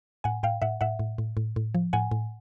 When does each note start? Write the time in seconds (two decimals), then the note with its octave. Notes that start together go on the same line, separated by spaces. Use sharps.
0.24 A2 F#5 G#5
0.43 A2 F5 G5
0.62 A2 E5 F#5
0.81 A2 E5 F#5
0.99 A2
1.18 A2
1.37 A2
1.56 A2
1.75 F3
1.93 A2 F#5 G#5
2.11 A2